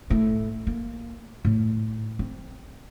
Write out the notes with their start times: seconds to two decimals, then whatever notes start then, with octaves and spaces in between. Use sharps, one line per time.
0.10 A2
0.67 A#3
1.45 A2
2.19 C4